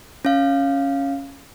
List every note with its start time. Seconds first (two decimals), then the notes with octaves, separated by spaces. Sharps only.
0.25 C#4 F5